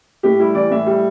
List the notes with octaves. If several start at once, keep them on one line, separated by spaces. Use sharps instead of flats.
A2 G4
G3 E4
E3 D5
A2 E5
G3